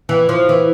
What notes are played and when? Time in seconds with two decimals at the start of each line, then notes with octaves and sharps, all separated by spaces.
0.09 E3
0.29 F3
0.49 E3